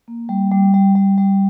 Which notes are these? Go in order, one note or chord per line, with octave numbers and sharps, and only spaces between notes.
A#3
G3
G3
G3
G3
G3